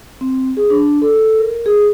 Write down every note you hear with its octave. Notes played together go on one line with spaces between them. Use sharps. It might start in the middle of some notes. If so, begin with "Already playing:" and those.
C4
G#4
D4
A4
A#4
G#4